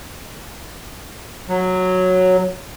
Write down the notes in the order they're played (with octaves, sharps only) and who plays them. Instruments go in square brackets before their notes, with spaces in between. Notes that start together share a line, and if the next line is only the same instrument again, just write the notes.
[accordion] F#3